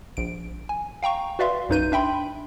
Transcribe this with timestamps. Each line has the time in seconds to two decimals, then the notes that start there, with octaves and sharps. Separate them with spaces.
0.17 A#1 D7
0.69 G#5
1.03 F5 G5 A#5 C#6
1.39 F#4 B4 D5 E5 F5 C6
1.69 B1 F#2 D#4 B4 G6 D#7
1.92 D4 E5 G5 B5 C6